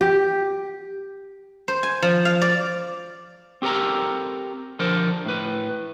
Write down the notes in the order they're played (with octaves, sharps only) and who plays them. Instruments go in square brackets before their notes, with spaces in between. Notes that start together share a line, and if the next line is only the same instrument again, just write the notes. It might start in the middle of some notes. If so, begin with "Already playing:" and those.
[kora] G4
[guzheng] C5
G#5
F3
F5
D5
[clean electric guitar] C4 G4 A4 A#4 A#5
D3 F3 A4 A#4 C5
A2 B4